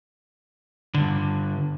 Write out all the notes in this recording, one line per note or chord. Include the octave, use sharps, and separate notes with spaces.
G2 D3